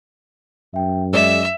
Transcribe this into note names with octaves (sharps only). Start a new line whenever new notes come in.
F#2 E5 G5
G#3 D5 E5 E6 E7